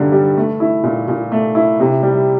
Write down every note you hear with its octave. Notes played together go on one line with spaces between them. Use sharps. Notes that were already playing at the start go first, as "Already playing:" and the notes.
Already playing: G2 D3 G3 A#3
G3
A3
E4
A#2
A#2
A3
E4
C3
G3